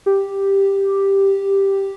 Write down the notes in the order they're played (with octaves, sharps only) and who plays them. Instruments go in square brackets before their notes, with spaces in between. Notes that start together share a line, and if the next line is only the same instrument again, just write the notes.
[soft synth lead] G4